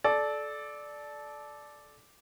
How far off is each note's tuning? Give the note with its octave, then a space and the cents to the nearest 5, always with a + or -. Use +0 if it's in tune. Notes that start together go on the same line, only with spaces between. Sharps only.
A4 -25 D5 +0